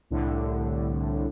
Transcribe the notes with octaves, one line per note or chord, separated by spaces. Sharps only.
C2 A2 D3